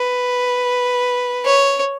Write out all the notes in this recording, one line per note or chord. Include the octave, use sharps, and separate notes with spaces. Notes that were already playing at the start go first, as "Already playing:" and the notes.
Already playing: B4
C#5